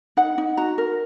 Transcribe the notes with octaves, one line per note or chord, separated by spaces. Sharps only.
D#4 F#5
D#4
F#4 A#5
A#4